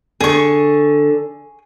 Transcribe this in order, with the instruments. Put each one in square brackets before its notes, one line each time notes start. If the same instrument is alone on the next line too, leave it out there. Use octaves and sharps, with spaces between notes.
[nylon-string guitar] D3 A4 [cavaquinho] G#4 C#6